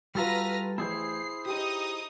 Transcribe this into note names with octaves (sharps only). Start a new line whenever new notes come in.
G3 F4 F#4 A4 B4 A#5 F6 A#6
A1 E4 G#4 C5 C7
D#4 G4 D#6